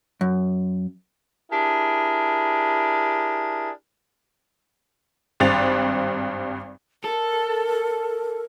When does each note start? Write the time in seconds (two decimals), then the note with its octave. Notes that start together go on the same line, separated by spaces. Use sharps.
0.21 F#2
1.52 D4 E4 G4 G#4 A#4
5.40 G#1 G2 C4 A6 F7
7.04 A4 A#4